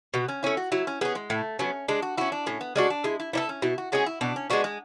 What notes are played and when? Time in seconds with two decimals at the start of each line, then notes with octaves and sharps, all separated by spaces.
0.14 B2 B3
0.28 C#4
0.43 A3 C#4 E4
0.57 F#4
0.72 F#3 E4
0.87 C#4
1.01 B3 C#4 G#4
1.15 G#3
1.30 A2 A3
1.59 F#3 B3 C#4
1.88 G#3 D4
2.02 F#4
2.17 C#4 E4 F#4
2.32 D4
2.46 A2 C#4
2.61 B3
2.76 G#3 C#4 D4 F#4
2.90 D4
3.04 G#3 E4
3.20 E4
3.33 B3 D4 E4 A4
3.49 C#4
3.62 B2 E4
3.78 F#4
3.92 G#3 C#4 F#4 G#4
4.06 E4
4.21 B2 D4
4.36 C#4
4.50 G#3 B3 D4 F#4
4.64 G#3